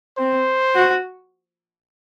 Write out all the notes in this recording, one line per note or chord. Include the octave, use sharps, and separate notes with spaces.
C4 C5
F#4